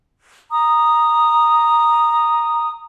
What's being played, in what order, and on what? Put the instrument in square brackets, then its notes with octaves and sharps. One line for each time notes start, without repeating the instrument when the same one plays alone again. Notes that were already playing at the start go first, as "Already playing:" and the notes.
[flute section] A#5 D#6